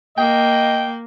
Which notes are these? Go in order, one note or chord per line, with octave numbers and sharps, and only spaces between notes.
A#3 D#5 G5